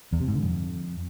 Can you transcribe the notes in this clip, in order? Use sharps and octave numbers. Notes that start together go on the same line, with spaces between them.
E2
C3
G#2
D3
F2